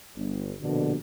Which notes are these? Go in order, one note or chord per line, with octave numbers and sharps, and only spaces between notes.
G1
A#1 B2 D3